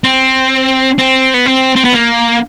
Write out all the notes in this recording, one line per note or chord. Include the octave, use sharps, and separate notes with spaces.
C4
C4
B3
C4
C4
B3
A#3